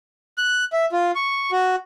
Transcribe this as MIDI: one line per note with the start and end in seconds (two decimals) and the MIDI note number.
0.38 0.65 90
0.73 0.85 76
0.92 1.11 65
1.16 1.51 85
1.52 1.76 66